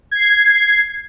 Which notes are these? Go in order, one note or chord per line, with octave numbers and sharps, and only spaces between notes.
G#6 C7